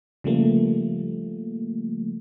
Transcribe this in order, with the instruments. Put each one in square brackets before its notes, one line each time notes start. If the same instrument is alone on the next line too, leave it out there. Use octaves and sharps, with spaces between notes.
[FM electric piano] C#3 F3 G3 A3 A#3